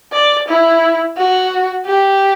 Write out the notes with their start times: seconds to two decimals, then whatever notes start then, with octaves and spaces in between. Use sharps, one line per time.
0.13 D5
0.48 E4
1.18 F#4
1.86 G4